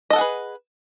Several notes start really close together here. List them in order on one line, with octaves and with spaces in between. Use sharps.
D#5 A4 F#5 G#4 B4